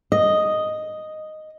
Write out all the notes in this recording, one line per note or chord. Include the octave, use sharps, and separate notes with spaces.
D#5